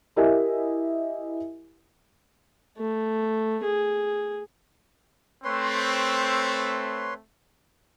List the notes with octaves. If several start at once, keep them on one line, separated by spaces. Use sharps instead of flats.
E4 G4 A#4 D#5 E5 G#5
A3
G#4
A3 C4 B4 C#5 C6